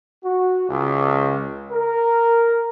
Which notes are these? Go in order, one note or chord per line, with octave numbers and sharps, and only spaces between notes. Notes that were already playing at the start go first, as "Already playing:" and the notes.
F#4
C#2
A#4